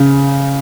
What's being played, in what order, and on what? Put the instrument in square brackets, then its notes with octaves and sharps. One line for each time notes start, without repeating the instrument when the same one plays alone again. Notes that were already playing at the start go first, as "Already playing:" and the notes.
Already playing: [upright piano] C#3